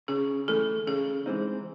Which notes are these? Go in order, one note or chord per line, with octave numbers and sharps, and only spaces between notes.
C#3 G#4
E3 A3 A4
C#3 G#4
E3 G#3 C4 D#4